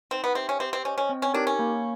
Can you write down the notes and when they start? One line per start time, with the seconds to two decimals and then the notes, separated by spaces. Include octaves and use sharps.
0.11 C4 D#4
0.24 B3
0.35 C4 G4 C5 E5 G5
0.49 C#4
0.60 C4 G4
0.73 C4
0.85 C#4 C5 D#5
0.98 C#4
1.09 C4
1.22 C#4
1.34 D4 D#4 G4 A#4 C#5
1.47 C#4
1.59 A#3